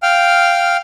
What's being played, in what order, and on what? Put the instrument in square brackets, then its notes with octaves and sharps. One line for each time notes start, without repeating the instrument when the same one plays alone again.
[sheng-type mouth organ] F5 G5 F6